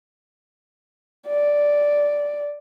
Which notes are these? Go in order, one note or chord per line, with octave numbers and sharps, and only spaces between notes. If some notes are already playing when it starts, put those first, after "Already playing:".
D5